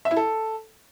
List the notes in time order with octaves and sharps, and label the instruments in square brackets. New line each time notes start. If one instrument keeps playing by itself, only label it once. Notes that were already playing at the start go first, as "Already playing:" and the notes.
[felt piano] E5
E4
A4